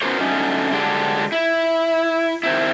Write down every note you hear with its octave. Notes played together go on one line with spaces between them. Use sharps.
B3 C#4 F#4 A#4 C5 C#5
D3 F#3 A3 C#4 D#4
D3 F#3 G#3 D4 G4
E4
D#3 C4 E4